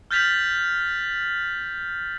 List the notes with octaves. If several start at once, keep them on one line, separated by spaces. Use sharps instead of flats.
F6 G6 A6 B6 F7 F#7